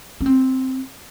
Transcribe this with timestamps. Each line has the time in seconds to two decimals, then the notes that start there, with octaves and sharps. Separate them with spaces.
0.21 C#4
0.26 C4